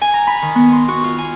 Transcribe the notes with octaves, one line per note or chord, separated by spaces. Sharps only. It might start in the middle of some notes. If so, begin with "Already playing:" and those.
G#5
A#5
B5
D#3
B3
C6
F#4
F4
G#5